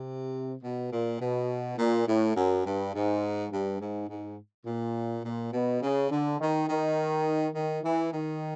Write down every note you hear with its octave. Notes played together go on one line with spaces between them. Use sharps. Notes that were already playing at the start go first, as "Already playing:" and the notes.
Already playing: C3
B2
A#2
B2
A#2
A2
F#2
G2
G#2
G2
G#2
G#2
A#2
A#2
B2
C#3
D3
D#3
D#3
D#3
E3
D#3